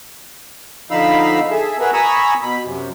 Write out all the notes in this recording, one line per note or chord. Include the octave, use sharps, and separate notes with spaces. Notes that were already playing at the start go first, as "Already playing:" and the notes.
D3 F3 D#4 F5 B5 E6
G#4 A4 E5
F#4 G#4 A#4 B4 E5
G#5 A#5 B5 C#6 D#6 E6
B2 B5
F#2 C3